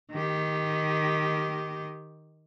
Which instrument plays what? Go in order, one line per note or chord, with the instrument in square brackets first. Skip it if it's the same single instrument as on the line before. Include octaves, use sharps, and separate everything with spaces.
[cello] D#3 G4